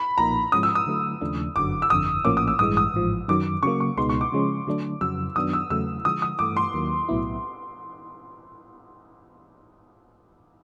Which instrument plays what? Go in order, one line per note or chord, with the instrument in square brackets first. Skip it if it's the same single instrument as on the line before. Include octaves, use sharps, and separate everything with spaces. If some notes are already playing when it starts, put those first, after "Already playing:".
Already playing: [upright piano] B5
[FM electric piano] B1 A#2 F3 A#3 D#4 [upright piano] A#5
[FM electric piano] G#2 F3 G#3 C#4 [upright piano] D#6
[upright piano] E6
D#6
[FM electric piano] D3 F#3 A3
D#2 C#3 F3 A3 D4
[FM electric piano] G1 F#2 D3 F#3 [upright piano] D6
[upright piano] E6
[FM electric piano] G1 F2 D3 [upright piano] D#6
[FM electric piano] A#1 A2 F3 A#3 C#4 [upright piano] D6
[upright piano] D#6
E6
[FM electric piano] A1 G2 E3 G#3 [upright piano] D#6
[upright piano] D#6
[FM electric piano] A1 G#2 F3
[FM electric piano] F#2 D#3 F#3 [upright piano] D6
[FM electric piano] C#3 F#3 A#3 [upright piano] C#6
[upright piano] C#6
[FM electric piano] C#2 B2 G#3 B3 D#4 [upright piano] C6
[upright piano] C#6
D6
[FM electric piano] C#3 F3 G#3 C#4
D3 F#3 A3 D4
[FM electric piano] F2 C#3 F#3 [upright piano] E6
[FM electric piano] F#2 D#3 F#3 B3 D4 [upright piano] D#6
[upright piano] E6
[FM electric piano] E2 C#3 F#3 A3 [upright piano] E6
[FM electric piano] D3 F3 G#3 [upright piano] D#6
[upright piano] D#6
[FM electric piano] G2 E3 A3 [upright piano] D6
[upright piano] C6
[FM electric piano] D#2 D#3 F#3 A#3
B1 A2 F#3 B3 E4